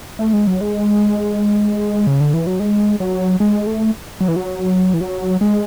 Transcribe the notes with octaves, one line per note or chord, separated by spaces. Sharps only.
A3
G#3
F#3
G#3
C#3
D3
E3
F#3
G#3
F#3
G#3
A3
F#3
E3
F#3
E3
F#3
G#3